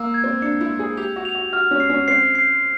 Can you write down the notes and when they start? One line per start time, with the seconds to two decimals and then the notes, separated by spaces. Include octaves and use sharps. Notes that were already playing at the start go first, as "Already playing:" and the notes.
Already playing: A#3 E6
0.14 G#6
0.24 C4
0.42 D4 C#7
0.61 E4
0.70 E6
0.79 G#4
0.97 G4 F7
1.16 F#4
1.25 F7
1.35 F#4
1.53 F#4 F6
1.71 C#4
1.80 C7
1.90 C#4
2.08 C4 C7
2.35 C7